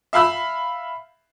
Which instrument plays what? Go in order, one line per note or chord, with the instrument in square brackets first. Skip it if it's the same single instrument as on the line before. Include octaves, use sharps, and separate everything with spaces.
[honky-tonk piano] E5 F5 B5 E6